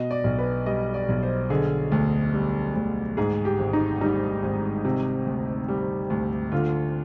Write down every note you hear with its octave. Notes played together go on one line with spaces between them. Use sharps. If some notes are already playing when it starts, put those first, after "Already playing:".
Already playing: B2 D#5
D5
B1
B4
G3 D#5
D5
B1
C5
D3 G#4
D2
G3
D2
G#2 G#4
G4
G#1
D#4
G3 D#4
G#1
C3
D2
G3
D2
D3 F4